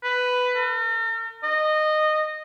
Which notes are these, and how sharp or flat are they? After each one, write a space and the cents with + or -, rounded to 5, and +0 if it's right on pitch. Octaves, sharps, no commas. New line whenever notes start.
B4 +10
A#4 -45
D#5 -15